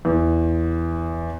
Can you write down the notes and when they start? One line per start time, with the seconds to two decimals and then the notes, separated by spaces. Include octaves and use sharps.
0.05 E2